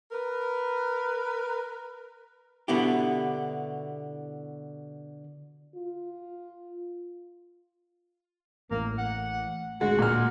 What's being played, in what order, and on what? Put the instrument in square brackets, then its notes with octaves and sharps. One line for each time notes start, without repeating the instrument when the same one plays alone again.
[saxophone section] A#4 B4
[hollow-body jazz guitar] B2 D3 B3 E4 G4
[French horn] F4
[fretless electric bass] A1 A2 [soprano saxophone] A#3
[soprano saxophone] F#5
[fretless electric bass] D1 D2 D3 [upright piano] G#3 [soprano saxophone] F#4
[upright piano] A#2 F6